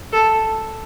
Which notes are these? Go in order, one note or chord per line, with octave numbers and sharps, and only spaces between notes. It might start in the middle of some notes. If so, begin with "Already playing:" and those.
A4